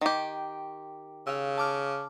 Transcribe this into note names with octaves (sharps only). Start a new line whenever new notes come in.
D#3 G4
C#3 F5 E6
A5 D6 F6